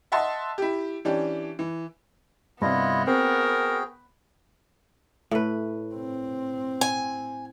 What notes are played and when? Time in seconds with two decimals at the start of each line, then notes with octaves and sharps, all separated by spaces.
0.12 D#5 E5 F#5 A5 C6
0.58 E4 G4
1.05 E3 C#4 D4 G4
1.59 E3
2.62 G2 C3 B3 E4 F4 D#5
3.07 C4 F#4 G#4 A#4 G5
5.31 A2 B4
5.95 C4
6.81 G#5